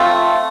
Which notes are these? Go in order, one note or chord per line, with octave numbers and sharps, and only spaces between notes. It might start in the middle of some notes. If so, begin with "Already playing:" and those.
Already playing: F3 A3 C4 F4